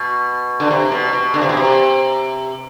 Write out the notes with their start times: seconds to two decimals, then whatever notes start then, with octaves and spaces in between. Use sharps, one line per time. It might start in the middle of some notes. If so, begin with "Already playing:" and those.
Already playing: B2
0.60 D3
0.71 C3
0.92 B2
1.13 B2
1.34 D3
1.41 C3
1.49 B2
1.57 C3